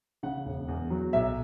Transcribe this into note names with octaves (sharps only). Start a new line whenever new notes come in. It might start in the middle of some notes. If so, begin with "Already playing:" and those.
C#3 F#5
E1
E2
F#3
B1 E5